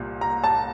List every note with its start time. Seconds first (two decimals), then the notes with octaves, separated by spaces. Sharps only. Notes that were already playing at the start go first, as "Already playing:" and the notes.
Already playing: C2 A#2
0.21 A#5
0.44 A5